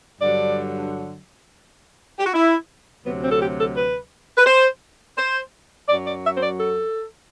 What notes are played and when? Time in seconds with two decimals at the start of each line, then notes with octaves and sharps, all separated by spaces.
0.21 G2 D3 F#3 D5
2.19 G4
2.26 F#4
2.34 E4
3.05 D2 C3 F#3 B3
3.23 C4
3.31 A4
3.41 G4
3.58 A4
3.75 B4
4.37 B4
4.46 C5
5.17 C5
5.88 F#2 F#3 D5
6.06 D5
6.24 E5
6.37 C5
6.42 D5
6.60 A4